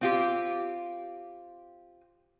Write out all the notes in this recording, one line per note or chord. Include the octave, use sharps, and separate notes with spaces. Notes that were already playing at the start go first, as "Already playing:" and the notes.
C4 F4 G4